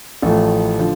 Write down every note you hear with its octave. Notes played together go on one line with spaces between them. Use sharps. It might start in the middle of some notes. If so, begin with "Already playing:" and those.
A1 A2 F3 A3
D3 F3